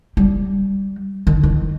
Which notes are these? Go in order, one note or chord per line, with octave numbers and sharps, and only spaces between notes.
G3
D#3
D#3